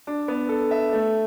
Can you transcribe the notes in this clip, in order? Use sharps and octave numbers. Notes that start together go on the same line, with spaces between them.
D4
B3
A4
E5
A3